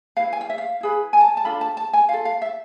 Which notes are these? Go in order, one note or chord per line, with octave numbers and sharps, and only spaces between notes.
E4 B4 F5
G#5
F5
E5
F5
E4 G#4 B4
G#5
A5
A5
D4 F4 A4 B5
A5
A5
G#5
F4 A4 F5
F5
E5